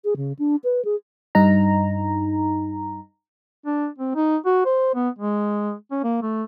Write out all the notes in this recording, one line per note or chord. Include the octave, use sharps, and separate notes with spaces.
G#4
C#3
D4
B4
G#4
G2 D#4 A#5
D4
C4
D#4
F#4
C5
B3
G#3
C#4
A#3
A3